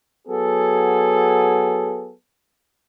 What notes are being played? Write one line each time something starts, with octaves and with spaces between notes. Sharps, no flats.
F#3 B3 G#4 A4